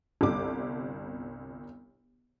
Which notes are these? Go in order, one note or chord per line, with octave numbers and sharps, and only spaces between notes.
G1 C2 D6